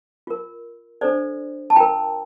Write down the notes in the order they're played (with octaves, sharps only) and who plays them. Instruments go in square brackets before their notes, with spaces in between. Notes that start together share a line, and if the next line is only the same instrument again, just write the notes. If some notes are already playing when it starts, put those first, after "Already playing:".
[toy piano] F4 A#4
D4 A4 C5 D5
A5
F4 A#4 G5 A#5